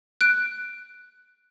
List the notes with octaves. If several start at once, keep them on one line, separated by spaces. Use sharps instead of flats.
F#6 D7